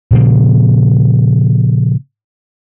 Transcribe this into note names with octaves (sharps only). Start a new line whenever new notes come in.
A#2 C#3 F3 A#3